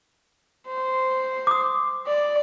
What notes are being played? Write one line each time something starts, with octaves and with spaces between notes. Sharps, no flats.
C5
D6 D#6
D5